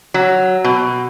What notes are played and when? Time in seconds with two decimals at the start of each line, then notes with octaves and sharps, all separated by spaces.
0.14 F#3
0.64 B2